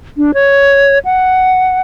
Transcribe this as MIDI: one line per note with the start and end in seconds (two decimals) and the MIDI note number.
0.17 0.32 62
0.34 0.99 73
1.05 1.81 78